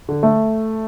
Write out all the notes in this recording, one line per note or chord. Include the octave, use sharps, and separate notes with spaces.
D3
A3